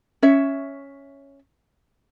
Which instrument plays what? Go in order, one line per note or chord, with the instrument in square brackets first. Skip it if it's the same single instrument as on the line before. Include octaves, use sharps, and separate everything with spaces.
[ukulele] C#4 C#5 E5